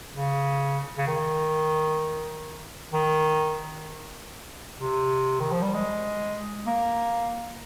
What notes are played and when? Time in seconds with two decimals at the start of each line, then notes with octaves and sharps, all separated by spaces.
0.13 C#3
0.98 C#3
1.07 D#3
2.93 D#3
4.80 C3
5.40 D#3
5.51 F3
5.62 G3
5.74 G#3
6.67 A#3